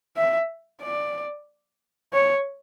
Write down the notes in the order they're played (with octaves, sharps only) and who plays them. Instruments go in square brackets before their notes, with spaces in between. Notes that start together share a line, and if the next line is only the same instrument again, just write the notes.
[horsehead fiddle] E5
D5
C#5